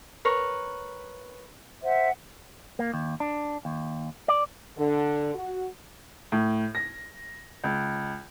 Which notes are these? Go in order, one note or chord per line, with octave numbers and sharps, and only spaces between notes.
A#4 B4 C#5
C5 E5 F#5
A#3
D#2
D4
D#2
D5
D3
F#4
A2
A#6
C#2